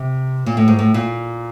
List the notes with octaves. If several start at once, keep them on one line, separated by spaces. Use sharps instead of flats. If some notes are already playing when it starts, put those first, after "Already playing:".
Already playing: C3
A#2
A2
G#2
A2
A#2